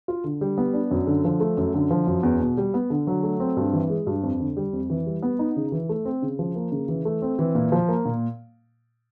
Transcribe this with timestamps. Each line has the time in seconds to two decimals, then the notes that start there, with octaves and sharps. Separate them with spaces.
0.08 F4
0.24 D3
0.41 G3
0.58 B3
0.73 D4
0.91 F#2
1.07 D3
1.24 F3
1.40 A3
1.57 F#2
1.74 D3
1.91 F3
2.07 F#2
2.23 E2
2.40 B2
2.57 G3
2.74 B3
2.90 D3
3.07 F#3
3.23 A3
3.40 C4
3.57 G2
3.73 E3
3.90 G#3
4.07 G2
4.23 F2
4.40 D3
4.57 G3
4.73 F2
4.90 E3
5.06 G3
5.23 B3
5.39 D#4
5.56 C#3
5.72 E3
5.89 A3
6.05 C4
6.22 C#3
6.39 F3
6.55 A#3
6.72 C#3
6.88 E3
7.05 A3
7.22 C4
7.39 E3
7.55 A#2
7.72 F3
7.88 A#3
8.05 A#2